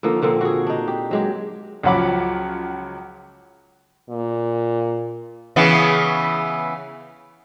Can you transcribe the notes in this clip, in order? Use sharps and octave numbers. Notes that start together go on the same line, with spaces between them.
D3 F3 A#3 D#4
A#2 D3 A#3 C4
F#4 G#4
D4 D#4
G4
F#3 G#3 G4
C#2 F3 F#3 F#5 B5 D6
A#2
C#3 E3 B3